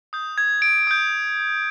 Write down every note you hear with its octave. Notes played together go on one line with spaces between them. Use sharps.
D#6 G6
G#6
D7
D#6 G6